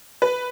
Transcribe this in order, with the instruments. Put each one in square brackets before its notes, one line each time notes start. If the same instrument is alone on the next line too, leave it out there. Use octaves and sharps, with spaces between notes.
[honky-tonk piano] B4